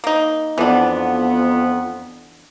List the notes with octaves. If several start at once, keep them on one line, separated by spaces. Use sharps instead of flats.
A#3 D#4
F2 E3 B3 D4